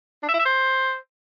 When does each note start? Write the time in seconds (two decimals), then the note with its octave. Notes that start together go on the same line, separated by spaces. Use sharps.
0.23 D4
0.29 E5
0.34 E4
0.40 E5
0.45 C5